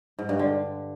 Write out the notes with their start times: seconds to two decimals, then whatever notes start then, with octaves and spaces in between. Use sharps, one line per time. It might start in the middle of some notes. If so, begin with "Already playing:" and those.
0.19 G#2
0.29 G2
0.39 D3